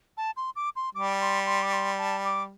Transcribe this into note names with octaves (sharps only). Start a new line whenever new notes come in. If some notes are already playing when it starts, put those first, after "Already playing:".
A5
C6
D6
C6
G3 D6
C6
C6
D6
C6
A5
D6